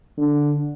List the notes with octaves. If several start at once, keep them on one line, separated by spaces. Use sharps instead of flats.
D3